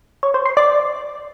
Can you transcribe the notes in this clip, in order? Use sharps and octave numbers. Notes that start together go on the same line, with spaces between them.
C#5
C5
C6
D5